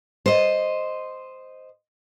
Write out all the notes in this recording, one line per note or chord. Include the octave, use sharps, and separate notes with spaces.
C5 D#5